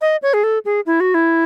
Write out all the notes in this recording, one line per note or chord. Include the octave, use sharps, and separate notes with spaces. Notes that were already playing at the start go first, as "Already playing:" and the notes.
D#5
C#5
G#4
A4
G#4
E4
F#4
E4